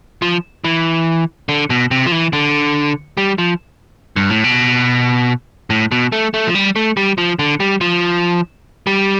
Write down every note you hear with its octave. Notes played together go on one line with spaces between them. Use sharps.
F3
E3
D3
B2
C3
F3
E3
D3
G3
F3
G2
A2
B2
A2
B2
A3
A3
F3
G3
A3
G3
F3
D3
G3
F3
G3